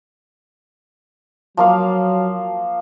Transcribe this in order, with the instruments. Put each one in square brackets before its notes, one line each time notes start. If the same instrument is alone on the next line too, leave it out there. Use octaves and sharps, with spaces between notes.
[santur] F3 A#3 F5 [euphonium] F#3